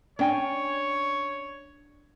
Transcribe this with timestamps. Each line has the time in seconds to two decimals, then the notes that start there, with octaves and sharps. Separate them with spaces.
0.19 C#4 D4 C#5 G5 G#5